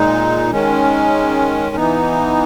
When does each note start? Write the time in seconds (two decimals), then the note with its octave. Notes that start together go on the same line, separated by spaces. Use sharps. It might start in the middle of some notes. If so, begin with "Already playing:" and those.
Already playing: A#2 G#3 D#4
0.51 D#3 G#3 C#4
1.76 E3 B3 D#4